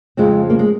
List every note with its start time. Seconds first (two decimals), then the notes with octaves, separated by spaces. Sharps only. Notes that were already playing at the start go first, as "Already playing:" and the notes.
0.17 F2 C#3 F3 G#3 C4
0.50 A#3
0.59 G#3